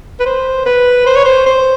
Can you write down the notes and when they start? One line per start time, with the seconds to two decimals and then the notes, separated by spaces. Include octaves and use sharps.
0.20 B4
0.26 C5
0.66 B4
1.06 C5
1.16 C#5
1.25 C5
1.46 C5